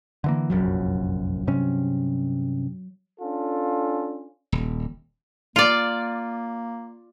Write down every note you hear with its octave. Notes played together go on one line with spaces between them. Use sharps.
D3 E3 A#3
F1 A#1 F#2 F#3
G2 C3 C#4
C#4 D4 F4 A4
D#1
A#3 F4 D5